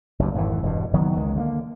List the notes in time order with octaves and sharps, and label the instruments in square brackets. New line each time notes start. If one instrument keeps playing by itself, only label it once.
[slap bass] F#1 D2 G2
G#1 F2 C#3 E3
E1 G2 B2
F#1 D#3 F#3 B3
C#2 D#3 G#3
D3 A3 A#3